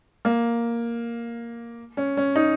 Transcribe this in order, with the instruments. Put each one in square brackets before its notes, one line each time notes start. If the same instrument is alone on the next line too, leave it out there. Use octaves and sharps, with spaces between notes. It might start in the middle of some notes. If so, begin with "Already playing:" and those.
[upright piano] A#3
C#4
C#4
D#4